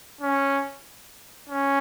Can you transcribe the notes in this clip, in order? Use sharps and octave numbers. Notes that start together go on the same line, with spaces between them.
C#4
C#4